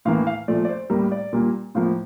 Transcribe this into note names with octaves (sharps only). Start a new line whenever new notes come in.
A2 E3 A#3 F5
F5
A#2 F3 A3 D5
D5
C5
A2 G3 A#3 A#4
D5
A#2 G3 A#3
A2 F3 A#3 F5